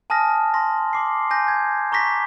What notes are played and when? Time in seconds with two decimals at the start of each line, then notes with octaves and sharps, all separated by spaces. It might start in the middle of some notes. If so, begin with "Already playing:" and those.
0.10 G#5 A5 D#6 F6 A#6
0.54 C6 A#6
0.93 C6 D6 C7
1.31 G#5 G6 A#6
1.48 G#6
1.92 A#5 C#6 D6 A#6 B6